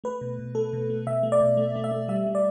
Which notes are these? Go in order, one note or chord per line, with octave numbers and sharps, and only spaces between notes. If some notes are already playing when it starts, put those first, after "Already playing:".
A3 B4
B2
B2
A3 A4
B2
A3
B2 E5
A3
D5
B2
A3
A3
E5
A3
G3 E5
G3
D5